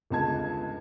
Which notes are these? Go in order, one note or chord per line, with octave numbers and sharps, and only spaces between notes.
G1 C#2 A5 G#6